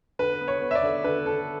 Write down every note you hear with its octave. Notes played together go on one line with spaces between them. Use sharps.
D3 B4
B3
C#5
B3
E5
D5
D3
D3 B4
D3 A4